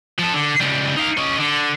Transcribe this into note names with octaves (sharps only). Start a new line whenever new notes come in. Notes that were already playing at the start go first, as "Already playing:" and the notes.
F3 A4
D3
C#2 G3
D#4 F5
C#4 D#5
D3